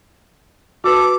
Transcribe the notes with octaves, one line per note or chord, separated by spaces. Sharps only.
F#4 A4 B4 D6